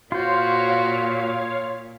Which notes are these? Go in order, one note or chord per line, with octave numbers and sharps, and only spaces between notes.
A#2 F4 F#4 C5 C#5 F5